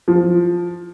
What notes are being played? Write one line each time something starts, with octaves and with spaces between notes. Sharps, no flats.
F3